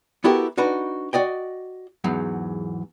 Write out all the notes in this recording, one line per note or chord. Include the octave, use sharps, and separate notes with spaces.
B3 E4 F#4 G4 A4 A#4
D4 D#4 F#4 B4
F#4 D5 D#5 G5
E2 G#2 F#3